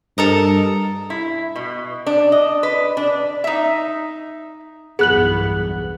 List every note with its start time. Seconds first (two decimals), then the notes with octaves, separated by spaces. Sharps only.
0.18 G2 A4 A#4 D#5
1.10 E4
1.56 B2
2.07 D4
2.32 D#5
2.63 B4
2.97 D4
3.44 D#4 E5
4.99 B1 E2 G2 B3 G#4 F#6 F#7